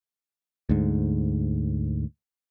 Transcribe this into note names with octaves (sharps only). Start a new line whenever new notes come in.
D2 G#2